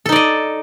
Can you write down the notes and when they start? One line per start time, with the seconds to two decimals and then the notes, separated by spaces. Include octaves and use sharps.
0.05 A4
0.09 D#4
0.12 D5
0.16 D#5